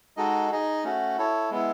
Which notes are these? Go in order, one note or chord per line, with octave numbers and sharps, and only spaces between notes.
G#3 D#4 F#4 A4 D#5
D#4 G#4 D#5
A3 C#4 F#4
E4 A4 C#5
G#3 B3 E4